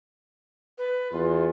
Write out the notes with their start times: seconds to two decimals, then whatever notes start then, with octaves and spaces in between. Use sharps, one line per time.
0.78 B4
1.12 E2 F4